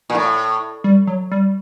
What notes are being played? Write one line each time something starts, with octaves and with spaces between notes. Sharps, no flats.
A#2
A2
G3
F#3
G3